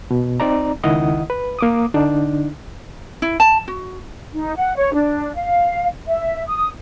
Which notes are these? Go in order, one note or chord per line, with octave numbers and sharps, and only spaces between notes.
B2
C4 D#4 D5 A#5
C#2 D#3 E4 D#5 F#5 D#6
B4
A#3 D6 D#6
D3 D4 D#4
E4
A5
F#4
D#4
F#5
C#5
D4
F5
E5
D#6